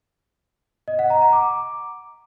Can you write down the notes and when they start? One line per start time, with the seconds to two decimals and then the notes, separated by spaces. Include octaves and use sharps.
0.88 D#5
0.99 F#5
1.10 A#5
1.21 A#5
1.33 D6